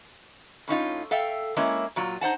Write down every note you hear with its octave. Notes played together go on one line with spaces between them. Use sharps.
A2 C#4 D#4 F4
A4 E5 F5 G5
G#3 A#3 C#4 E4 E5
A#2 F#3 F4
D#4 C5 F#5 A5